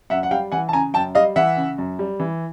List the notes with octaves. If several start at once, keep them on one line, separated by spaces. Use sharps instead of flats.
F#2 E5 F#5
F#5
G3 F5 G5
E3 F#5 G#5
A5
C#3 G#5 A#5
F#2 G5 A5
G3 D#5 F5
E3 E5 F#5
C#3
F#2
G3
E3